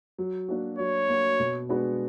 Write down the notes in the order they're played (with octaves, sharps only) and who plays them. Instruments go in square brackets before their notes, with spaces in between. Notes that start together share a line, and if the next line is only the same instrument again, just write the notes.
[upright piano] F#3
A#3 D4 F#4
[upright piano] F#3 [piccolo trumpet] C#5
[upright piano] A#3 D4 F#4
B2
G#3 B3 D4 F#4